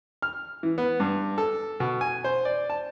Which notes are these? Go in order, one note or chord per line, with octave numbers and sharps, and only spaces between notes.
F6
E3
B3
G2
A4
B2
G#5
C5
D5
A5